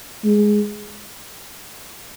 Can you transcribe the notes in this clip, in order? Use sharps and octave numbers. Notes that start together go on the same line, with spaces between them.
G#3